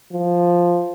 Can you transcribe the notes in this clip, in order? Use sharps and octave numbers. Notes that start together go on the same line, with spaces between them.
F3